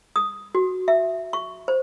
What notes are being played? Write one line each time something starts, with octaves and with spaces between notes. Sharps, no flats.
D#6
F#4
E5
C#6
C5